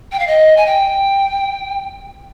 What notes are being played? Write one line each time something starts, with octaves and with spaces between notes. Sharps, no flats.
G5
F5
D#5
G#5
G5